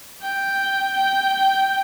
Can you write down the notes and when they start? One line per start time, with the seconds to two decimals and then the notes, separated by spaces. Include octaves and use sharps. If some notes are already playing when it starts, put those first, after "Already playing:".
0.22 G5
0.98 G5